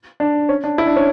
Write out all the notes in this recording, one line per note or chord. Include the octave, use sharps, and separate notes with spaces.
D4
C#4
D4
E4
D4
C#4